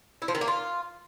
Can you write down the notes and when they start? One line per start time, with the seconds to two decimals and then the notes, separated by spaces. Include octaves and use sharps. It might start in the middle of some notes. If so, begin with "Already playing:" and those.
0.22 E4
0.28 F3
0.35 D#3
0.41 A#3
0.48 F4